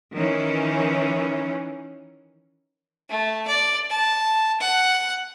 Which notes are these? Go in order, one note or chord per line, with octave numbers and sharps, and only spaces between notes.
D#3 E3 C#4
A3
D5
A5
F#5